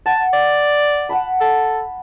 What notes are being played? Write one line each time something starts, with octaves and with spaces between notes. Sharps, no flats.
F#5 A5
D5
F#5 A5 B5
A4